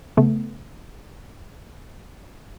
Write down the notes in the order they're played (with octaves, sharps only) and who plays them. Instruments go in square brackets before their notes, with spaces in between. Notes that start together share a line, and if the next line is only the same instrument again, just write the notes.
[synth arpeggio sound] C#3 A3 B3